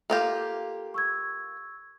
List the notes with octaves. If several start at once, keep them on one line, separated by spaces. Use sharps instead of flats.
A#3 F4 G4 A4
C#6 E6 G#6